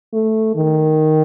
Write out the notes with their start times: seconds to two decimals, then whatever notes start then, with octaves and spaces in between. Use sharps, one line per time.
0.13 A3
0.56 D#3